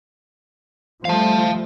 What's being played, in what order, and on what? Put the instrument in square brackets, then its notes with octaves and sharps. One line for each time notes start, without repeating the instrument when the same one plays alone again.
[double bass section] F3 G3 A3 [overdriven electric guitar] F5 A5